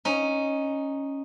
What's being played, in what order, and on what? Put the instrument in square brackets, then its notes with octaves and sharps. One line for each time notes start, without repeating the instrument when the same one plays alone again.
[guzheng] C#4 D#4